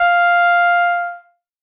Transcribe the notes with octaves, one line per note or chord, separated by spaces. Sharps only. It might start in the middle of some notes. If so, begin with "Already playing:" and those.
Already playing: F5